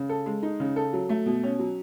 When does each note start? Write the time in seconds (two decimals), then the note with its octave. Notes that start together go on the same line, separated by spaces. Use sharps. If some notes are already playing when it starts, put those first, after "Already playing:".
Already playing: C#3
0.09 A4
0.26 G#3
0.43 D#4
0.60 C#3
0.76 A4
0.93 F#3
1.09 A3
1.26 B2
1.43 C#4
1.59 F#3